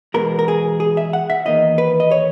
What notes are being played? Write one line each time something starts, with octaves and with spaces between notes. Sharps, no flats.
E2 B2 G#3 B3 A#4
A#4
G#4
G#4
E5
F#5
E5
E2 D#3 A#3 D#5
B4
D#5
C#5